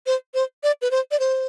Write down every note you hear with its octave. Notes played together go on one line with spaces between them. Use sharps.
C5
C5
D5
B4
C5
D5
C5